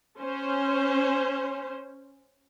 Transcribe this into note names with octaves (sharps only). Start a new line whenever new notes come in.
C#4 C5